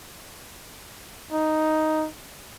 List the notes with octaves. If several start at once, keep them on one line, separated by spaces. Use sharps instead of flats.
D#4